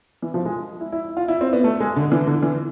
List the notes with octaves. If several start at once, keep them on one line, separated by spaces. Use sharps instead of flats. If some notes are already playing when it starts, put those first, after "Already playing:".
E3
F3
G#3
E4
E4
F4
E4
C4
B3
A3
G#3
D3
E3
D3
E3